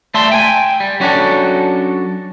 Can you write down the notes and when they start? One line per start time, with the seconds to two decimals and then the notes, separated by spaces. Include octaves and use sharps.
0.14 A3 D5 E5 A5 C6
0.32 G5 G#5
0.80 G3
1.00 F#3 C#4 D4 F#4 A4